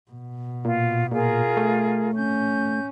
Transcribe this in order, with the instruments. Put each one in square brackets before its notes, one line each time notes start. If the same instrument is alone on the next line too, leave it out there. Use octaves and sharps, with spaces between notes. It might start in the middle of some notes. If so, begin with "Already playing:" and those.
[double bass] B2
[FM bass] A#2 [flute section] F4
[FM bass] A#2 [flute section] F4 G#4 A#4
[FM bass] A3
[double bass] C#4 [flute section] G6